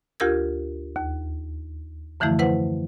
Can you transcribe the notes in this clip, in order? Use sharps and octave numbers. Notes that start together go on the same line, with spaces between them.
D2 F4 G4 A#4 E6 G#6
D#2
F#2 D3 E3 F3 A3 E4
E4 B4 C5 F#5